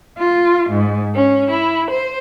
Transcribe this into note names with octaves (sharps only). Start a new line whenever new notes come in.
F4
G#2
C#4
E4
C5